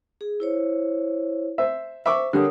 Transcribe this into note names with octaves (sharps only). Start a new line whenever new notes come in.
G#4
E4 C5 C#5
C5 E5
C5 E5 C#6 D6
D3 G3 A#4 C#5 D#6